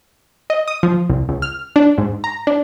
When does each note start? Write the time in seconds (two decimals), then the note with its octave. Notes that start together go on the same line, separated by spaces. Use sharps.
0.50 D#5
0.68 D#6
0.83 F3
1.10 C2
1.29 C#2
1.42 F6
1.76 D4
1.98 G#2
2.24 A#5
2.47 D4